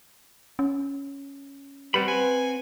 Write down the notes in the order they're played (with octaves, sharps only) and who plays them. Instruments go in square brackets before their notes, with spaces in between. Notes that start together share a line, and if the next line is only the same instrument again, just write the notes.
[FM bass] C#4
[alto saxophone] G3 [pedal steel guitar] C4 F#5 B5 [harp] B4
[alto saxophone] G#5